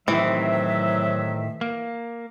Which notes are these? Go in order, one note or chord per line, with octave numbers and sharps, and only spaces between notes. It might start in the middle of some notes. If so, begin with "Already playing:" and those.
A2 C3 D#3 E3 F#3 C4 E5
A#3